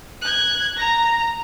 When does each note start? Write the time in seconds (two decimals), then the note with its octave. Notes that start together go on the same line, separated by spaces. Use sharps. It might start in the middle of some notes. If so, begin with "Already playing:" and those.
0.22 F#6 G#6
0.77 A#5 A#6